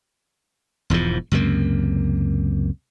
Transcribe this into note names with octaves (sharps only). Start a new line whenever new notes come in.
E1 E2 G#2 F3
C#2 F#2 C3 A#3